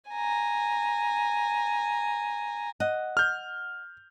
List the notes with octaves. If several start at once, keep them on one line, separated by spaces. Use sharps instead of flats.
G#5 A#5
D#5 F#5
F6 G6